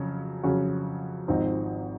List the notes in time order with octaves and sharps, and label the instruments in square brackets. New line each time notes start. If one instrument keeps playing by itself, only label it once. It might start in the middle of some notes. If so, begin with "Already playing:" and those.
Already playing: [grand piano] F2 C#3 F#3 C#4
F2 C#3 F#3 C#4 F#4
G#1 G#2 F3 C4 D#4